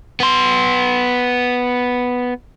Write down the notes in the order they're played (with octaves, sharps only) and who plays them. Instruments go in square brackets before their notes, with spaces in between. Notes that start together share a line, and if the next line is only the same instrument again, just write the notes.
[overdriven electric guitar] B3 C6